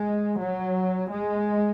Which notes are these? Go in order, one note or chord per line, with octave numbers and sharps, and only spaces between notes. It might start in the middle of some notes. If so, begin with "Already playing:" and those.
Already playing: G#3
F#3
G#3